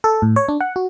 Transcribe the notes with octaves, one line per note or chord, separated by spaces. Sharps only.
A4
A2
C#5
D4
F#5
F#4